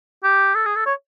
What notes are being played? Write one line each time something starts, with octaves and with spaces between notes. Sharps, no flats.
G4
A4
G#4
A4
C#5